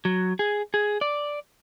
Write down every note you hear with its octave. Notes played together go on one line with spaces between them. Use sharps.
F#3
G#4
G#4
D5